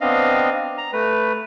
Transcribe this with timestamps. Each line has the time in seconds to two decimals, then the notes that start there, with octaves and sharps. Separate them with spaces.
0.01 B3 C4 D4 D#5 F5
0.78 A#5
0.93 A3 B4